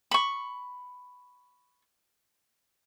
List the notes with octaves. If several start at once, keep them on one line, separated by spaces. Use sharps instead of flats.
B5 C#6